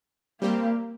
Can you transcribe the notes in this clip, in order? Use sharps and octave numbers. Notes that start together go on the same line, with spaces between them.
G3 A#3 C4 G4